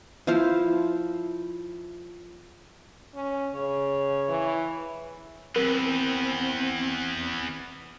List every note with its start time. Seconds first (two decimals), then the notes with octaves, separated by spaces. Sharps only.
0.27 F3 E4 C5 F5
3.15 C#4
3.55 C#3 C#5
4.29 E3
5.56 E2 B3 C4 A#4